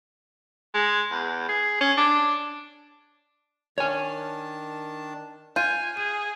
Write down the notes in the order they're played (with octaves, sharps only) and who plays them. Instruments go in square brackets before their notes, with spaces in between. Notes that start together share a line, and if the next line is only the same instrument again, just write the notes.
[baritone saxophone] G#3
E2
G#4
C#4
D4
[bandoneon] D#3 D4 A5 [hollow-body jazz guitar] C#5 G#5
[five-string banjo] F4 [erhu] G#5 [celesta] G6 D#7
[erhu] G#4 [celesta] D#7